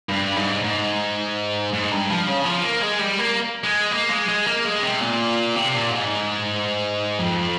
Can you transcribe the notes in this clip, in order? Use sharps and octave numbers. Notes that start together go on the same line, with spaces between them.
G2
G#2
G#2
G#2
G2
F3
C#3
F3
A#3
G#3
G3
A#3
G#3
A#3
G#3
G#3
A#3
G#3
C3
A#2
C3
A#2
G#2
F2